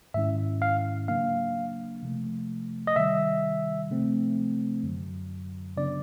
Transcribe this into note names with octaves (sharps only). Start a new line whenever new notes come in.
G#2 D#3 G#3 C#4 E4 E5
F5
C#3 F#3 A#3 D4 F5
C3 F3 A3
D#5
C3 D#3 G3 E5
C3 F3 A3 C4
F#2 D3 F#3
C#3 F#3 B3 D4 D5